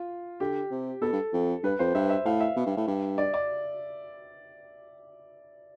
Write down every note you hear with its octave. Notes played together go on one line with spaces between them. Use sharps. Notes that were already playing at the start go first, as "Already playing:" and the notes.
Already playing: F4
D3 G4
C3
B2 A4
G2
F2
G2 B4
F2 C5
G2 E5
E5
A2 F5
E5
B2
G2
A2
G2
D5
D5